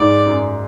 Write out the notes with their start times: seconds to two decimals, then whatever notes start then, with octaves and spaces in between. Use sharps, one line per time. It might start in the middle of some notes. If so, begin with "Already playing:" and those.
Already playing: G#2 D5
0.26 F#2